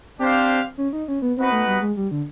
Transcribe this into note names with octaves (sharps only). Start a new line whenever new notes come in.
C4 D4 G4 C5 F5
C#4
D#4
C#4
B3
B3 C4 D#4 F#4 B4
A3
G3
G#3
G3
D3